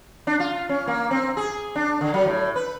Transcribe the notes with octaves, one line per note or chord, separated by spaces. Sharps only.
D4
F4
C#4
A#3
C4
G#4
D4
D3
F#3
A2
B4